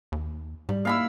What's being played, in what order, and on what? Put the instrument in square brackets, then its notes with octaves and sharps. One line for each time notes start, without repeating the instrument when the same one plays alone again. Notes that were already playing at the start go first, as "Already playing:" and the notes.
[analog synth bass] D#2
[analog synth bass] G#2 [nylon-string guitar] G3
[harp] A#3 D#4 E4 [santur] F5 B5 E6